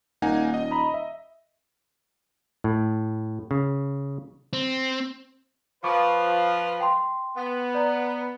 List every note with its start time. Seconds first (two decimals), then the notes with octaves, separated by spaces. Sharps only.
0.22 D#1 A#3 D#4 F#5 G#5
0.54 D#5
0.71 A#5 B5
0.94 E5
2.64 A2
3.51 C#3
4.53 C4
5.84 F3 B4 B5 C#6 D6
6.80 G5 A5 C6
7.37 B3
7.75 D5 A#5